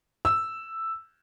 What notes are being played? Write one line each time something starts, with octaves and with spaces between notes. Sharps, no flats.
E6